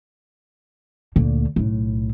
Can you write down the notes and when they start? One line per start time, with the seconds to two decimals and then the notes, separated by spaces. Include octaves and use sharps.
1.16 D2 A#2
1.56 B1 A2